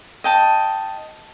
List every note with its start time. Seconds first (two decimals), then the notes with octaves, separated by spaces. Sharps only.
0.24 D#5 G5 A5